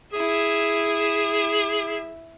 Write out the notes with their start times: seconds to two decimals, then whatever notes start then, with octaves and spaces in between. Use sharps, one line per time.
0.13 E4 G#4 E5